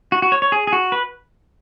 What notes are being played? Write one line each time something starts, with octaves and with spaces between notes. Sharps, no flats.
F#4
F#4
C#5
C#5
G#4
G#4
F#4
B4